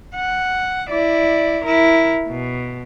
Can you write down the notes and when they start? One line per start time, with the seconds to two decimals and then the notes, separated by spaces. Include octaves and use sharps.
0.15 F#5
0.90 E4 D5
1.64 E4 A#4
2.28 B2